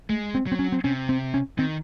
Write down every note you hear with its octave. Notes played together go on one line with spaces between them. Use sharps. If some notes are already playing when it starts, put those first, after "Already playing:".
G#3 A3
C4
F#3 C4
C#4
C4
C3 C#4
C4
C#4
D#3 C4